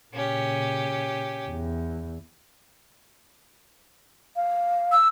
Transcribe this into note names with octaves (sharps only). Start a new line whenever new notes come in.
A#2 C#3 C#4 G4
E2
F5
E6